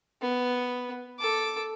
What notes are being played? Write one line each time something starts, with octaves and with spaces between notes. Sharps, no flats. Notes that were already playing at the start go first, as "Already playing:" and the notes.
B3
A4 D6